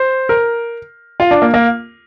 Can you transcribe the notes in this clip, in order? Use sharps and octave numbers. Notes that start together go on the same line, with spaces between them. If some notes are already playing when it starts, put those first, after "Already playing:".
Already playing: C5
A#4
F4
D4
A#3
A#3